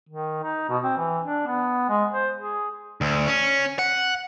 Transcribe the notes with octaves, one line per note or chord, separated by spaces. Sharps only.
D#3
D#4
B2
C4
E3
D4
B3
G#3
C5
G#4
D2
C#4
F#5